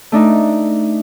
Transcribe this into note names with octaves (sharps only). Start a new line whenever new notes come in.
A3 D4 D#4